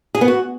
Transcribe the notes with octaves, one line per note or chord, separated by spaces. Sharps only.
G#4
B3
F#4